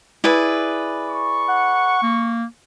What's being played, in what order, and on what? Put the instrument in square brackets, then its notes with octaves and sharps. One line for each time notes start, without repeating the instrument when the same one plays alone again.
[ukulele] E4 [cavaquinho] G#4 B4 D5
[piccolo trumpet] C#6
[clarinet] F#5
A#3